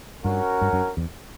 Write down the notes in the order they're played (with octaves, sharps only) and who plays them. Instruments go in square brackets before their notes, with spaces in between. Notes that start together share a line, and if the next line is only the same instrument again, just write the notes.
[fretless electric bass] G2 [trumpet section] C#4 F#4 A#4
[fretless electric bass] G2
F#2
E2